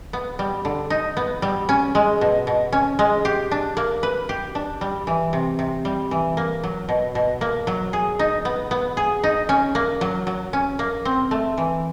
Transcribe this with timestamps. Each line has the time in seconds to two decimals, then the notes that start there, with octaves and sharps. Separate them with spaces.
0.13 B3
0.39 G3
0.65 D3
0.90 D#4
1.17 B3
1.42 G3
1.69 C#4
1.95 G#3
2.21 B2
2.47 B2
2.72 C#4
2.99 G#3
3.25 G4
3.51 D4
3.77 A#3
4.03 B4
4.29 G4
4.55 D4
4.81 G3
5.07 E3
5.33 C3
5.59 C3
5.85 G3
6.11 E3
6.37 A#3
6.64 F#3
6.89 B2
7.15 B2
7.41 A#3
7.67 F#3
7.93 G#4
8.19 D#4
8.45 B3
8.71 B3
8.97 G#4
9.24 D#4
9.49 C#4
9.75 A#3
10.01 F#3
10.27 F#3
10.53 C#4
10.79 A#3
11.05 C4
11.31 A3
11.57 E3